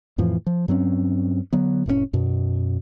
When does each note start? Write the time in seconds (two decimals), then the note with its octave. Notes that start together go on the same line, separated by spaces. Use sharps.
0.18 F2 A2 E3 F3
0.47 F3
0.68 G2 F#3 C4 C#4
1.53 D3 F#3 B3
1.86 F1 A2 C3 C#4
2.13 F#2 B2